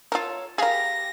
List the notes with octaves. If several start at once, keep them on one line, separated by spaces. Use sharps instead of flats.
F4 A4 A#4 C5 C#5
G4 G#4 A#4 F5 B5 A#6